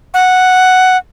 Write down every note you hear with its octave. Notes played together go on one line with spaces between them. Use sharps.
F#5